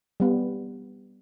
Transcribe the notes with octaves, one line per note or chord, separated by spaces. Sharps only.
G3 B3